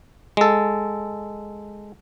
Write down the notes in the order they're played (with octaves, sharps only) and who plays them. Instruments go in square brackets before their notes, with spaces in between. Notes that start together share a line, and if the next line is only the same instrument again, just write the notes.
[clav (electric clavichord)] G#3 A4